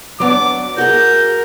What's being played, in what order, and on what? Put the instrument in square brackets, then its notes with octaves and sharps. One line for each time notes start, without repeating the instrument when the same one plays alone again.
[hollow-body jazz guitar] F#3 B3 D4 [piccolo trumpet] D6
[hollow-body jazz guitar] F#4 G#4 [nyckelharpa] A#4 [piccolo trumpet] G6